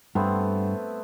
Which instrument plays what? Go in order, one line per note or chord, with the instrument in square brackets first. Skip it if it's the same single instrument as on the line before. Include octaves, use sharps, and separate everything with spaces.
[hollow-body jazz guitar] G2 [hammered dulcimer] A3 B3 C4